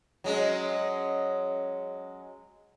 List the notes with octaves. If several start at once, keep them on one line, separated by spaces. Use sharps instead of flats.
F#3 G#3 C#4